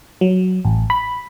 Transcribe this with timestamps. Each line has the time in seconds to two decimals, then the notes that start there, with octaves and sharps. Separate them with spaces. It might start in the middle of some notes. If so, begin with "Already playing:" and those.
0.21 F#3
0.65 A1
0.90 B5